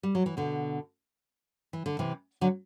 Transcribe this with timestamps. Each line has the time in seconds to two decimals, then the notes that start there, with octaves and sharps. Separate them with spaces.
0.03 G3
0.15 F#3
0.26 E3
0.37 B2 D3
1.73 E3
1.86 D3
1.99 C3 E3
2.41 D3 F#3